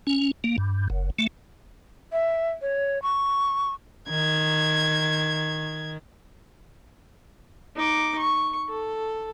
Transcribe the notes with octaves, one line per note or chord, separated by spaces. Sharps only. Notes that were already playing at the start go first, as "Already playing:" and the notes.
C#4
A#3
G2
F#1
A3
E5
C#5
C#6
D#3 G#6
D#4 D6
C#6
A4